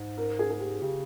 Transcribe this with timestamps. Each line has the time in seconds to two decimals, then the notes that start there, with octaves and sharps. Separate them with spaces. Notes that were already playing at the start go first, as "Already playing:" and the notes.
Already playing: G#2
0.18 A#4
0.39 G#4
0.51 G#4
0.60 G4
0.82 C#3 G4